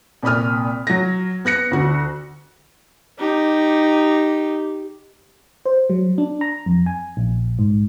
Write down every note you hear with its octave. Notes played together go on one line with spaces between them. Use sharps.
C2 A#2 B5 D#6 F6
F#3 A#6
B3 F#6 A#6 C#7
D2 F#4
D#4 G4
C5
F#3
D4
A#5
F2
G#5
A#1
G#2